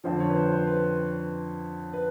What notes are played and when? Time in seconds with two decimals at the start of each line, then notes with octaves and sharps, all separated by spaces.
0.04 F2 D3 F3 C5
0.20 C#5
0.29 B4
0.35 C5
0.52 C5
0.67 B4
1.93 B4